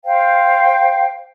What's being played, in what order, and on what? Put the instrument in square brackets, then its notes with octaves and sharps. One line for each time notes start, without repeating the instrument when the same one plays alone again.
[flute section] C5 F5 G5